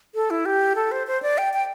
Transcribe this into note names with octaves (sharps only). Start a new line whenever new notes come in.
A4
E4
G4
A4
C5
C5
D5
G5
G5